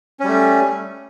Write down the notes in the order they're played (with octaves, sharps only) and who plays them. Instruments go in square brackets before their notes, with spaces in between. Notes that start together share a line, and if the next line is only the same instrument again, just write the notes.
[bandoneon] C#4
G3
A3